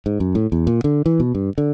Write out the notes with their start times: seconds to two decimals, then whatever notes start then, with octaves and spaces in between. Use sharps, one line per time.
0.06 G#2
0.20 F#2
0.35 A2
0.52 E2
0.67 A#2
0.84 D3
1.06 E3
1.20 B2
1.35 G2
1.58 D3